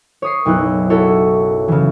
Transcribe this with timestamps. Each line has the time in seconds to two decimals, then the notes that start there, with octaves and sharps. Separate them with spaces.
0.22 C#5 D#6 C7
0.45 F#1 B1 E4 F#6
0.90 E4 F#4 A4 C#5
1.68 C#3 E3